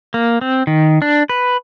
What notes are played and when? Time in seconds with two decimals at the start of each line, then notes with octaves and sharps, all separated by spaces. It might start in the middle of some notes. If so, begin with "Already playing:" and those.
0.14 A#3
0.41 C4
0.67 D#3
1.02 D4
1.29 B4